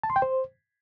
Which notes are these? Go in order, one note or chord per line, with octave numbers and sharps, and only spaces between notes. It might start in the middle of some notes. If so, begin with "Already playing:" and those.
A5
C6
G5
C5